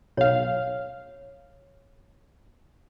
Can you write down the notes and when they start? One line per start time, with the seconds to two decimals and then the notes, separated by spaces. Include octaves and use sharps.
0.17 B1 C#5 F5